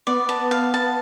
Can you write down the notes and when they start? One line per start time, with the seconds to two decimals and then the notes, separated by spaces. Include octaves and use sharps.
0.07 B3 D5
0.29 A5
0.51 F5
0.74 A5